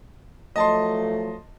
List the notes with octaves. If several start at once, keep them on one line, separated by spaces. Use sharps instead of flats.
F3 F#3 A3 D#5 A5 C6